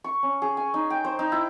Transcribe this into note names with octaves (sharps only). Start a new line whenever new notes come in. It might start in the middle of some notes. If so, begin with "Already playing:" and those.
C#6
C#4
G#4
G#5
D#4
G5
C5
D#4
E4